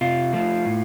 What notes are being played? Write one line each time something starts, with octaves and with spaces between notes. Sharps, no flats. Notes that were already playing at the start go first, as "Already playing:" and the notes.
C3 F4
F3 A3
A2